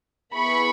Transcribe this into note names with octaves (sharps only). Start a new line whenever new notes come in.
B3 E4 G#4 B5 C#6